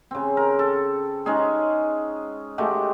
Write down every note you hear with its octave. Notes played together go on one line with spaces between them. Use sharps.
C#3 C4
A#4
A4
G#3 C#4 D#4 G#4
G#3 A3 F#4 G4